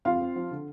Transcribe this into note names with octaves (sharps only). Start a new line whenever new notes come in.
F2 F4 F5
C4
F3
D3